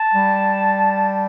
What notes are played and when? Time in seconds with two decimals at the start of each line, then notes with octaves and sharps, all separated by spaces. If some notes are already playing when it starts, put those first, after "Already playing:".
Already playing: A5
0.14 G3